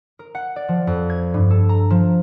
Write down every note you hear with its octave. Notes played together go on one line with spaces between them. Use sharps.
A#4
F#5
D5
F3
F2
G#6
G2
A4
A#5
F3